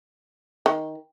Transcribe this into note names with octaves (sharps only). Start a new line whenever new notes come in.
D#3